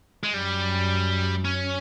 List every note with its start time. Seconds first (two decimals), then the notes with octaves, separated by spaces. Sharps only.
0.24 G#3
0.34 F#2 G3
1.45 C#4